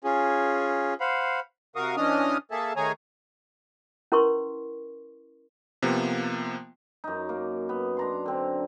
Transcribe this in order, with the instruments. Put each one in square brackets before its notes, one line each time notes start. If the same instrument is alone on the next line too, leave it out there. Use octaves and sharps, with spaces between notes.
[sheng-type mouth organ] C#4 F4 G#4
C5 F5 F#5 B5
[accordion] C3 F#4 A#4 F5 C#6 D#6
E3 C#4 D4 D#5 D#6 F6
A#3 G#4 A4 E5 A5
D#3 A3 G#4 C#5 G#5 A#5
[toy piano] C#4 E4 A#4 B4 C6 C#6
[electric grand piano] C3 F3 A#3 B3
[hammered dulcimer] F#2 D#4
A#3
B3
D4 A#5 C6
D3 C4